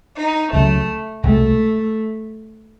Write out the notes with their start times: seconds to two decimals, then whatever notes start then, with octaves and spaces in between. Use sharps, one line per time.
0.17 D#4
0.53 C#2 C#3 F#3 A3
1.23 C2 B2 G#3 A3